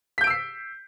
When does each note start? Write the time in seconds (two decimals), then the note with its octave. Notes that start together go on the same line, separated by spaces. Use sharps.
0.18 B6
0.21 G6
0.24 D7
0.27 E6
0.30 C7